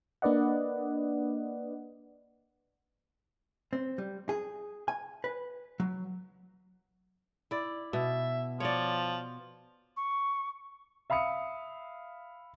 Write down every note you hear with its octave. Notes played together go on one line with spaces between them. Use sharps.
A#3 D4 B4 D5 D#5 F#5
C4
G3
G#4
G#5
B4
F#3
E4 D5
B2 E5
F3 C#5 D5
C#6
E5 F5 B5 D#6 C#7